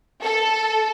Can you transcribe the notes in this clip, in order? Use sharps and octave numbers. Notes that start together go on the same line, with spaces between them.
A4